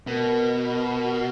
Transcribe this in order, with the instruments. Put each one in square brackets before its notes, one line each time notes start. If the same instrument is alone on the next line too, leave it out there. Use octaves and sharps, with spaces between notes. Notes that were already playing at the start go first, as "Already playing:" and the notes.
[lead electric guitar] B2 [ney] A#4